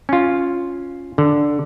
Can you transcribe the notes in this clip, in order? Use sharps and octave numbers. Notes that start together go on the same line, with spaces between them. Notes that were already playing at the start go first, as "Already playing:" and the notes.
C#4 F4
D3